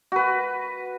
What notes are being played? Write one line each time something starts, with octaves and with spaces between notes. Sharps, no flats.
F#4 B4